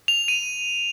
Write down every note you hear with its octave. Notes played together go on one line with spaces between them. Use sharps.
F7
D#7